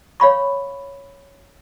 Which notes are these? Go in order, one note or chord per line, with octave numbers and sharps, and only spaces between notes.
C#5 F5 B5 C#6